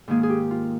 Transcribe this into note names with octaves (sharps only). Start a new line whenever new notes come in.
G#2 D#3 A#3 G#4
G#4
G4
F4